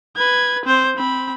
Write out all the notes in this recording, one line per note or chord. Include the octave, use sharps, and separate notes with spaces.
B4 G#6
C4 C5
C4 B5